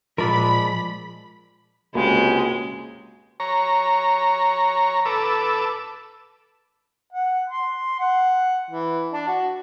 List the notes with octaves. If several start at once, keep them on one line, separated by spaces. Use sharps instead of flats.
A#2 F3 G#3 A#4 D5 B5
C#2 C3 G#3 A#3 F#4 B5
C#5 A#5
A4 B4 D6 E6
F#5
C6
F#5
E3
D4
F#4